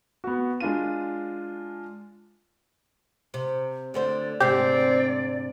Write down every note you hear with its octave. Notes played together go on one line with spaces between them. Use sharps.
B3 F#4
G#3 D4 F4 D#7
C3
D2 D3 C5 D5
D2 G#2 C3 C4 G4 D5